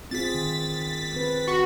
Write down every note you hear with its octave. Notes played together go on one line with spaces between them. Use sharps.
C4 F4 G#4 A6 B6
D#3
C4 B4
F#4